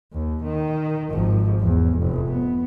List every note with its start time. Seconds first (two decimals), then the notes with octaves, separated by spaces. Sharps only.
0.13 D#2
0.44 D#3
1.11 G#1 F3
1.61 E2
1.98 F1
2.27 B3